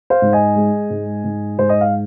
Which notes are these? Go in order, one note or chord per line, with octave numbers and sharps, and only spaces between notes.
C5 F5
G#2
D#5 G#5
G#3
G#2
G#2
G#2 C5
D#5
F5